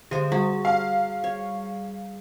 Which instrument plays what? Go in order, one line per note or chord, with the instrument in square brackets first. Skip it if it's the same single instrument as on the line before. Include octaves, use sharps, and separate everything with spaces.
[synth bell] D3 G4 [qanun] G#3 C5
[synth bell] G3 G#4 [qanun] F#4
[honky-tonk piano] F5
[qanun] C#5